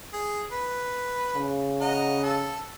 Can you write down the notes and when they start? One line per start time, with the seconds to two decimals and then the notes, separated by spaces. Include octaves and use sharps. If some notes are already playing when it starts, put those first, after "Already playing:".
0.13 G#4
0.52 B4
1.36 C#3
1.81 D#5 F#5 A#5
2.23 A4